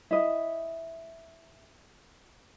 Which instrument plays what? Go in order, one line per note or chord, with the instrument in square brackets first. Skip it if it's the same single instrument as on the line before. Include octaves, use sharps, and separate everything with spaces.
[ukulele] E4 D#5